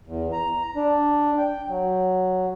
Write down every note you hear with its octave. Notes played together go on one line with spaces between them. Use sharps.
E2
A#5
D4
G5
F#3